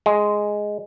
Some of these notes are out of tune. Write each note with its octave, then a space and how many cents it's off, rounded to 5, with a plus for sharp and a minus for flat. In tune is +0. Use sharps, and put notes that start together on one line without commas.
G#3 +0